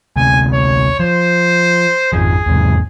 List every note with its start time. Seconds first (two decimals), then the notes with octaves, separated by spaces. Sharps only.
0.16 D2 C3 G#5
0.53 C#5
1.00 F3 C5
2.13 G#1 F2 F3 G#4
2.46 E2 G#2 C3